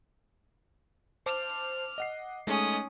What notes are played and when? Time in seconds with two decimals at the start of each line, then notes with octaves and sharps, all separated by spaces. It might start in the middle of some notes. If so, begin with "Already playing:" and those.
1.26 C5 A5 D6 F6
1.98 D#5 F#5 C7
2.47 G#3 A3 C#4 D#4 D#6